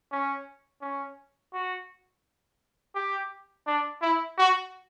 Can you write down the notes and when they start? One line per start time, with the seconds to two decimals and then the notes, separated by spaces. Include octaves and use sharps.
0.12 C#4
0.81 C#4
1.53 F#4
2.95 G4
3.67 D4
4.02 E4
4.38 F#4